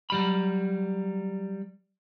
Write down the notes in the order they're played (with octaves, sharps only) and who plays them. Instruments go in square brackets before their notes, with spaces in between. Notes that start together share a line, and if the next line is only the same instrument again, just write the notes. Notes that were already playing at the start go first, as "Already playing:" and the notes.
[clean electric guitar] F#3 G3 B5